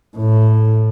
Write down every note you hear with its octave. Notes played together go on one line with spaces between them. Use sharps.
A2